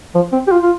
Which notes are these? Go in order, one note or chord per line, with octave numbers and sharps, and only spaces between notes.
F3
C4
G4
F4
F4